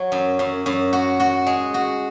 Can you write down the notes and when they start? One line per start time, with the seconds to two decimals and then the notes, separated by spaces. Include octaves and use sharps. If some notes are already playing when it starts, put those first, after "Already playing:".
Already playing: F#3
0.12 F#2
0.39 F#2
0.66 F#2
0.93 F#4
1.20 F#4
1.47 G#3
1.74 F#4